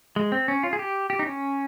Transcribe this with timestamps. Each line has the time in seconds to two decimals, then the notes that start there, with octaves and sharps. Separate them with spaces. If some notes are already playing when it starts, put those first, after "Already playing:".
0.16 G#3
0.32 C4
0.48 C#4
0.63 F4
0.73 G#4
0.79 G4
1.10 G4
1.19 D#4
1.26 C#4